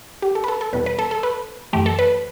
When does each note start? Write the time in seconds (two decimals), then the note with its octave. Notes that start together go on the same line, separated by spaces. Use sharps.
0.22 G4
0.35 A4
0.44 B4
0.48 A4
0.61 A4
0.73 E2 B2 G3 B4
0.86 B4
0.99 A4
1.11 A4
1.23 B4
1.73 F#2 E3 A3 G4
1.86 A4
1.99 B4